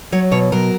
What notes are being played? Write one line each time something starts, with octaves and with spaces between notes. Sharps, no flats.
F#3 C#5
B2 C#5
F#3 A#4